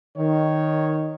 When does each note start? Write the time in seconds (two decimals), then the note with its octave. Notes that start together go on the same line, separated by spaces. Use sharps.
0.17 D#3 C#5